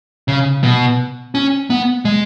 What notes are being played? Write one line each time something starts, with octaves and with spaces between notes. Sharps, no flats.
C#3
B2
C#4
B3
G#3